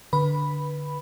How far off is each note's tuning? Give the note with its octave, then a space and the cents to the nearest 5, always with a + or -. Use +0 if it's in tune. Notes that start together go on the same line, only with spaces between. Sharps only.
D3 +0 B4 -15 B5 +0